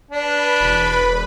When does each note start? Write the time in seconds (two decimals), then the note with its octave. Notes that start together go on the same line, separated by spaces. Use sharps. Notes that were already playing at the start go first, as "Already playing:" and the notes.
0.11 D4 B4 B5
0.60 E1